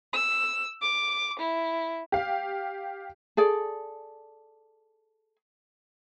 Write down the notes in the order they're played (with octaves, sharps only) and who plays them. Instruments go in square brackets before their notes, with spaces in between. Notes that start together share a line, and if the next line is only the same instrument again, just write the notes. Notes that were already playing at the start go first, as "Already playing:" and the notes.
[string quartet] E6
D6
E4
[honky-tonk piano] G4 F5
[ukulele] G#4 A4 D5